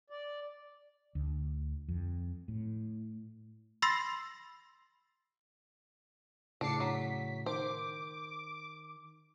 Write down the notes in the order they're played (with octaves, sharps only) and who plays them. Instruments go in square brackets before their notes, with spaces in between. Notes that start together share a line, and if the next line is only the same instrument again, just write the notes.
[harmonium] D5
[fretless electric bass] D2
F2
A2
[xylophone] B5 C6 E6 A6 A#6 C7
[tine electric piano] A2 C#3 [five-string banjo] D4 [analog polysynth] D6 C7 C#7
[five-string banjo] F#3 [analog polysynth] B6
[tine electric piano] D#3 [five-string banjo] C5 [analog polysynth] D6